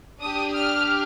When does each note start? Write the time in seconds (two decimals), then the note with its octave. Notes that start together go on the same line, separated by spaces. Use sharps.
0.20 D4 G4 D#6
0.55 F6